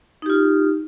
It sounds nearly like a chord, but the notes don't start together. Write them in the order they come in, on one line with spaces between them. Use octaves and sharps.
D#4 G4 F4